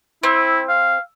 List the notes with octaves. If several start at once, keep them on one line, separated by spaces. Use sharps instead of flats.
C4 E4
F5